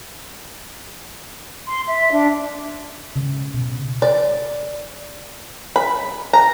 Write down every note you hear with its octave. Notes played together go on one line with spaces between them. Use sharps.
C6
E5
D4
C#3
B2
D5
B5
A#5